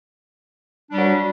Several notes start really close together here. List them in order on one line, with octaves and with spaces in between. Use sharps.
D4 G3 F#3